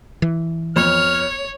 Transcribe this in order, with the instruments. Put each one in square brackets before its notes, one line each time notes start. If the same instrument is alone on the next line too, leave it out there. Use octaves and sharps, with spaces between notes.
[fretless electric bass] E3
[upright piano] F2 B3 [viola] C#5 [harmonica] F6